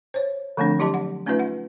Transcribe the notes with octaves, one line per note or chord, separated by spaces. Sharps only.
C5 C#5
D3 F3 A3 B3 C4 D4
F#3 E4 G4 D#5 A5
F#5
A3 C#4 D#4 F4 B4 E5
F#5